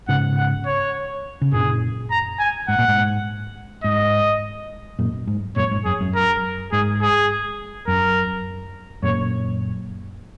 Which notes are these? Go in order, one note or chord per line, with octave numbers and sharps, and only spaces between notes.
G#2 C#3 F#5
F#5
C#5
C#3
F#2 A#2 G#4
A#5
G#5
G#2 F#5
A#2
G#2
G#2 D#5
F#2 A#2
G#2
F#2 A#2 C#5
G#2
F#2 G#4
F#2
A#4
G#2 G#4
G#4
F#2 A#4
F#2 A#2 C#5